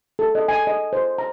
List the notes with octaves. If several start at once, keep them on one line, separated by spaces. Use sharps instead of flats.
A4
D#5
G#5
D#5
C5
A#5